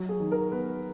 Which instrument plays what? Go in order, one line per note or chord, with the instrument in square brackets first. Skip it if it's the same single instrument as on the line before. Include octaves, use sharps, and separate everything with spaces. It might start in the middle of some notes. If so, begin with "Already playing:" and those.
Already playing: [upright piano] F#3 F#4
G#4
D#3
A#4
B3 B4